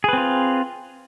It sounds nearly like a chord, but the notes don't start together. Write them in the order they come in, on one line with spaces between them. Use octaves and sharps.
G#4 B4 C4 F4